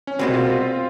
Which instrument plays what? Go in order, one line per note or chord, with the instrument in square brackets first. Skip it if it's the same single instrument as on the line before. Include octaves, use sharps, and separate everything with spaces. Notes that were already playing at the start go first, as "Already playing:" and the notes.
[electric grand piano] C#4
[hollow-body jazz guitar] C2 B2 G#3 [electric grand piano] C4
[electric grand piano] F4